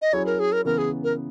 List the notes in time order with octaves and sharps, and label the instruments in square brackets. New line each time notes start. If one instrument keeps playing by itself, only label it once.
[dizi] D#5
[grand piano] F#3 C#4 E4 G#4 [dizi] C#5
[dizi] A#4
G#4
A#4
[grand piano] C#3 E3 B3 [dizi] A#4
[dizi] G#4
A#4